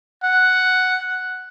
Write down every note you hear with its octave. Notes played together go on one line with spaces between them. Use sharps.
F#5